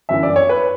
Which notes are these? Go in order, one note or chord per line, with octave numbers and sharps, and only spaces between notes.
G1 F#2 E3 E5
D5
C#5
B4